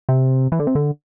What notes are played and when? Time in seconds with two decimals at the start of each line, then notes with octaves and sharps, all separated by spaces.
0.09 C3
0.52 E3
0.59 D3
0.67 C3
0.75 D3